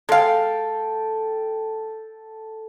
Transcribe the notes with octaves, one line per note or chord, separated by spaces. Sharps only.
G#3 A4 F5 G5